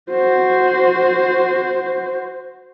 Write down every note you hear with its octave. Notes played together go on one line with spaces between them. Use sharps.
F#4 C5